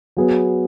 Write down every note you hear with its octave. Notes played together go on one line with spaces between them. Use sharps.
F#3 B3 G#4